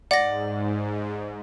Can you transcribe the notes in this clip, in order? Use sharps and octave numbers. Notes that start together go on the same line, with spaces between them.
G#2 D5 F#5 A#6